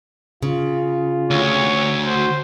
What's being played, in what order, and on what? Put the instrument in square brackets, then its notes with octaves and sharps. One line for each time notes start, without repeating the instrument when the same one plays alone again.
[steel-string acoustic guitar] C#3 [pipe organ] F4
[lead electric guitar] D2 [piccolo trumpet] C#5
[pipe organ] F#4 [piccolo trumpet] C5